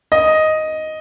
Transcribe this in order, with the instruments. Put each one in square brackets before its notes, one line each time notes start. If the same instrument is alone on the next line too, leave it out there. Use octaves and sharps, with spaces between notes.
[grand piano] D#5